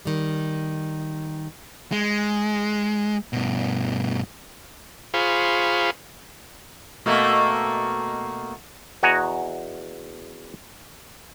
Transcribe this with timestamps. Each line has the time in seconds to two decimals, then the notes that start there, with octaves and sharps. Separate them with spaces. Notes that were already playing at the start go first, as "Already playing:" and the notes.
0.05 D#3 G3
1.92 G#3
3.33 G2 B2
5.14 F4 G#4 C5 F5 B5 C#6
7.06 B2 A3 A#3
9.03 E2 F#4 D#5 G#5 A#5